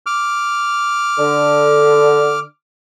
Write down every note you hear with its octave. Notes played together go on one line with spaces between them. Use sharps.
D6 F6
D3